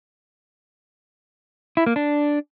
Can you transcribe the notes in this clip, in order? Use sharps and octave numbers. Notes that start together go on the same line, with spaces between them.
E4
A#3
D4